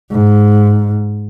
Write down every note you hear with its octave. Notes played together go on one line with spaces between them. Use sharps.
G#2